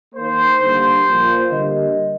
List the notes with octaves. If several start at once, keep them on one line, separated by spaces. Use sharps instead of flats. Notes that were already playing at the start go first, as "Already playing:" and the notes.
D#3 A#3 C5
D3 G3 A#3
A#2 F3 A#3
D3 G3 A#3 D#5